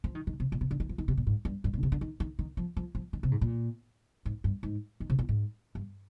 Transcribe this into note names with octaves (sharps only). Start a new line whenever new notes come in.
F3
D#3
D#3
C3
A#2
C3
D3
D#3
F3
D#3
C3
A#2
G#2
G2
G2
G#2
D3
C3
D3
D#3
D#3
D#3
F3
F3
F3
D#3
C3
G#2
A#2
G#2
G2
G#2
D#3
C3
A#2
G#2
G2